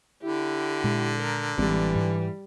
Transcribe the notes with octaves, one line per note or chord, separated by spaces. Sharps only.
D3 E4 G4
A#2 G#3
A#4
A1 E3 G3 G#3 C4
G#2